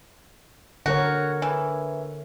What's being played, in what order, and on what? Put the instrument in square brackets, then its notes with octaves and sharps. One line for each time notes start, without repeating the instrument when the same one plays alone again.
[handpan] D3 A#4 C#5 [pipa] F#4
[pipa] E3